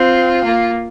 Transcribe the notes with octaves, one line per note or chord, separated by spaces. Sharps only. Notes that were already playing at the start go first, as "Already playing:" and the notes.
Already playing: C4 F4
A#3